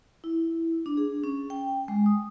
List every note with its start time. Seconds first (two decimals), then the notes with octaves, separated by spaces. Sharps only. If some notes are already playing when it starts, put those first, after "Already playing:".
0.24 E4
0.86 D4
0.97 G#4
1.24 C#4
1.50 G5
1.88 G#3
2.06 D#6